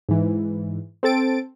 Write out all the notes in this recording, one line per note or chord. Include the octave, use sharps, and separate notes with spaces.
G#2 E3
C4 A4 A6 D7